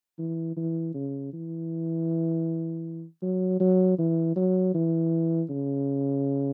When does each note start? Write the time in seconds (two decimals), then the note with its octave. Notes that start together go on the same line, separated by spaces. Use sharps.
0.19 E3
0.57 E3
0.94 C#3
1.33 E3
3.22 F#3
3.60 F#3
3.99 E3
4.36 F#3
4.74 E3
5.50 C#3